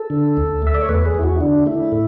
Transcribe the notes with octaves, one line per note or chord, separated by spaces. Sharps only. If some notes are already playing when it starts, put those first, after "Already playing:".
Already playing: A4
D3
D2
A3 E5
D5
C#5
E2 B4
G#4
E2 E4
F#4
E4
D3 D4
A3 E4
A2